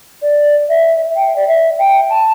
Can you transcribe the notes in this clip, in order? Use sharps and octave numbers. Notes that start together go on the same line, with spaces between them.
D5
E5
G5
D5
E5
G5
A5